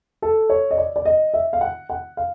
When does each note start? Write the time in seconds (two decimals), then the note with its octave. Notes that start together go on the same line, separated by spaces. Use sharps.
0.22 A4
0.50 C#5
0.71 D#5
0.78 D5
0.96 D5
1.05 D#5
1.34 E5
1.53 F5
1.61 F#5
1.90 F#5
2.17 F5